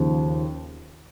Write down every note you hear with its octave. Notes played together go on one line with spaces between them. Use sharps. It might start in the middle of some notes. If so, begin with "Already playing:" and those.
Already playing: D#2 C#3 F3